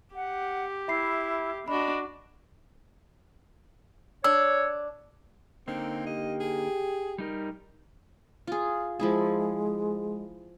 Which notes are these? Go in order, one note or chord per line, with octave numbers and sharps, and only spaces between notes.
G4 F#5
E4 E5 B5 C7
D4 F#4 D#5 B5
D4 C#5 E6
D3 A#3 C4 D#4
G4 D#5
G#4
G3 D#4 A#4
F4 G#4
F3 G#3 E4 G#4